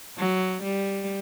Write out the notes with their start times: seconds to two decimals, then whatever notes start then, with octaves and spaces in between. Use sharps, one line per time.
0.18 F#3
0.63 G3